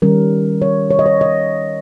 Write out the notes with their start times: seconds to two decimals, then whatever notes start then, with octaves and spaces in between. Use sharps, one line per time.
0.02 D#3 G3 C#4 A#4
0.62 C#5
0.90 C#5
0.99 D#5
1.06 C#5
1.21 D#5